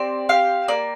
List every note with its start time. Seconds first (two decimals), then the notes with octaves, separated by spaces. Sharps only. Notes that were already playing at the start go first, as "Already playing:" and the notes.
Already playing: C4 G4 D5
0.29 G4 F5
0.68 A#3 D5